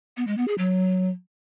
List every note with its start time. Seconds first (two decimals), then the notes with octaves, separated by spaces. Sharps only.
0.17 B3
0.27 G#3
0.38 B3
0.48 G#4
0.58 F#3